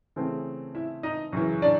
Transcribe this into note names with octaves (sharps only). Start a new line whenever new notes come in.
C#3 E3 A3 C4
E4 E5
D#4 D#5
F#2 C#3 E3
D4 D5